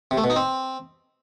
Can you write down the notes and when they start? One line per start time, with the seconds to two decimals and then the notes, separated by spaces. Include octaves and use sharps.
0.11 C3
0.17 A3
0.24 B2
0.30 D#4
0.36 C4